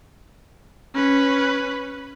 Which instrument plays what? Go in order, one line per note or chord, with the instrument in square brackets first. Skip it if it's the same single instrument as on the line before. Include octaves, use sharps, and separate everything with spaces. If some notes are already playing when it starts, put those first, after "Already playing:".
[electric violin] C#4 B4